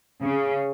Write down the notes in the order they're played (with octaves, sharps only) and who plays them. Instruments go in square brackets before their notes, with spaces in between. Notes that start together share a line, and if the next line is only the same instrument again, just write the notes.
[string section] C#3